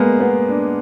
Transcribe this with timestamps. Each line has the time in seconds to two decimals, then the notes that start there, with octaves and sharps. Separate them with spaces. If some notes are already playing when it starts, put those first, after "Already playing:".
Already playing: G#3 A#3 B3
0.20 B3
0.49 D4